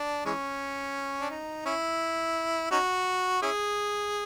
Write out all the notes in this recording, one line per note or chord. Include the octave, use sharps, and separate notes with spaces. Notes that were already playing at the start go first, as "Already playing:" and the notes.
Already playing: D4
E3 G#3 C#4
D4
D#4
C#4 E4
C#4 D#4 F#4
C#4 E4 G#4